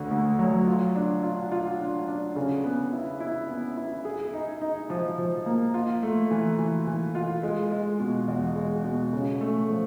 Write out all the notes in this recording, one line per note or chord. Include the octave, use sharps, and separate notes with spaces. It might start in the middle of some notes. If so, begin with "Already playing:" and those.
Already playing: D2 D3
D2
F#3
F4
D4
F4
F4
D4
D4
C#3
B3
E4
E4
B3
E4
G#4
D#4
D#4
F3
F3
A#3
F4
A3
E3
E3
E3
F4
G#3
G#3
B2
E2
G#3
B2
C#3
A3
F3